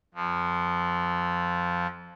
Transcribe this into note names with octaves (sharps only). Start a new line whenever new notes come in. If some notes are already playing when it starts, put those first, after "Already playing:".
F2 F3